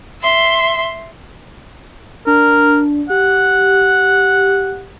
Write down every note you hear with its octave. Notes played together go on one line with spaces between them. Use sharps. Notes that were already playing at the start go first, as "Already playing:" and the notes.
E5 C6
D4 A#4
G4 F#5